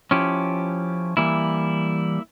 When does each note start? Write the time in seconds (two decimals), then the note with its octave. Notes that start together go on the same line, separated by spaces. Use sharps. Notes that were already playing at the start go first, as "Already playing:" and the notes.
0.11 F3 C#4 E4 G4
1.17 E3 G3 A#3 E4